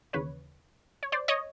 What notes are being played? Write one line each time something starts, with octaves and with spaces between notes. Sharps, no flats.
D#2 C#3 E3 B4 C#5
C#5
C5 D5
C#5 D#5